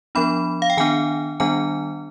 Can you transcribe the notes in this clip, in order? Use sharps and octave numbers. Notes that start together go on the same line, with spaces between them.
F3 B3 D4 B5
F5
G5
D#3 B3 D4 G#5
D#3 G3 B3 D4 G#5